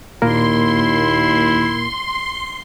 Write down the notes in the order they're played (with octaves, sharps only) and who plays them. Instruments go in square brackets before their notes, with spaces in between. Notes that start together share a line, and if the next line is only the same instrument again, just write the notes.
[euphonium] D#2 [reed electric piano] A#2 A#3 A#4 [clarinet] E4 [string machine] C6